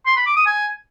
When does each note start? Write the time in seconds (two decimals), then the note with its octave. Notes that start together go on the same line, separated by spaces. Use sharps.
0.06 C6
0.16 B5
0.26 D6
0.36 D#6
0.46 G#5